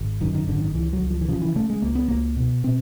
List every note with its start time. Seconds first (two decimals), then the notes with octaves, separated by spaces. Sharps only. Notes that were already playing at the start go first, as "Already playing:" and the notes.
Already playing: G#1
0.21 F#2 D#3
0.35 D#3
0.48 G#1 D3
0.61 D#3
0.74 C#2 E3
0.93 F#3
1.02 C#2
1.10 F3
1.21 E3
1.28 C#3 F3
1.42 E3
1.56 C#3 A3
1.70 G#3
1.82 C#2 A#3
1.95 B3
2.08 C#2 A#3
2.36 B2
2.64 B2 C4